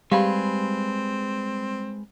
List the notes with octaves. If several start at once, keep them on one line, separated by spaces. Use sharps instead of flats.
G3 G#3 C4 G4 G#4 B4 F5